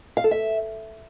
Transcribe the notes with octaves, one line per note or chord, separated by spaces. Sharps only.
F5
A4
E5